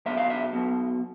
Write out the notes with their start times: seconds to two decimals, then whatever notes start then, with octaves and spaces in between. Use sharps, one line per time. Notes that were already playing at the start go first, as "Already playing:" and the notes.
0.06 B1 B2 E5
0.18 F5
0.30 E5
0.53 B1 B2